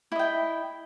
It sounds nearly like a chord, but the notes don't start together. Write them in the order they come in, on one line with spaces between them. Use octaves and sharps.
E4 D#5 G5